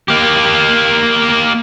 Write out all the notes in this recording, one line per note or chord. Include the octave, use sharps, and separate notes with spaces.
A#3 G4